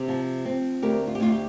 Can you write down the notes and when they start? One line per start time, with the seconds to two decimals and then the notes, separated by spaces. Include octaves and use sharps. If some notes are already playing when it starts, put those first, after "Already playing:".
Already playing: C3
0.08 F3
0.45 C4
0.82 D2 G4 A#4
1.07 F4
1.15 G4
1.20 D2 F4
1.32 G4